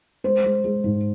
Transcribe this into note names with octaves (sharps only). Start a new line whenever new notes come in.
G#3 C5
G#3
G#3
G#2